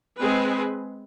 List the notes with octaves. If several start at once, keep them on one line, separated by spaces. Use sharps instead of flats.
G#3 C4 G#4 B4